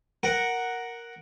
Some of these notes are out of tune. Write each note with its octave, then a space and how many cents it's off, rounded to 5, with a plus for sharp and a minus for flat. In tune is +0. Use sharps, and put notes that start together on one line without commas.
A#4 +0 F#5 +0